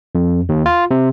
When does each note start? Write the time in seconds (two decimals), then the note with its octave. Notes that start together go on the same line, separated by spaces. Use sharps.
0.15 F2
0.49 D#2
0.66 F4
0.91 C3